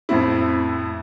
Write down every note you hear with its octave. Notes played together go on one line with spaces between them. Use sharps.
F2 A2 C4 E4